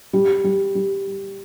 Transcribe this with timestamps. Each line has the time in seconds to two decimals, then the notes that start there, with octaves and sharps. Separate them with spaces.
0.13 G3
0.44 G3
0.75 G3